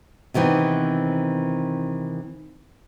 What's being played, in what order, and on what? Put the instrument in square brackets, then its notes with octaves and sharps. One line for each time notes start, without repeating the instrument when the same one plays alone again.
[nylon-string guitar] C3 D#3 E3 B3 C4